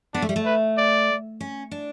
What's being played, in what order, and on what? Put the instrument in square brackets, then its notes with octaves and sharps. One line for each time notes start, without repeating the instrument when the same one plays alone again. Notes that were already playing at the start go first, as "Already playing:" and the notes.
[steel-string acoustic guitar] B3 [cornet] D4
[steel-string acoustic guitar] A3
G3
A3
[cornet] B4
D5
[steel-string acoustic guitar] C#4
D4